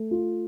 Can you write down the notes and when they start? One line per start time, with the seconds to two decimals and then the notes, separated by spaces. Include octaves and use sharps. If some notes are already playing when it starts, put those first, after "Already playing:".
Already playing: A3
0.11 F4